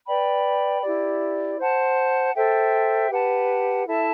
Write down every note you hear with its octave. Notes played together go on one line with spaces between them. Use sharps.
B4 D5 G5 B5
E4 G4 D5
C5 F#5 A5
A4 C5 E5 G5
G4 B4 F#5 A5
E4 A4 E5 A5